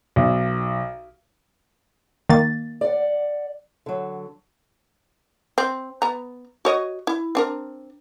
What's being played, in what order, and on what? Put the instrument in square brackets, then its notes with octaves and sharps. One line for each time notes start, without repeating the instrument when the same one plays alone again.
[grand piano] B1
[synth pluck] D#3 A#3 A6
[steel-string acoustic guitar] D5 F#5
D3 F#3
[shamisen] C4
B3 A#5
F#4 C#5 D#5
E4
C4 D4 A#4